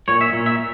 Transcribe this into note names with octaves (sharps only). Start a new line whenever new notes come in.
A#2 C#5
E5
A#2
E5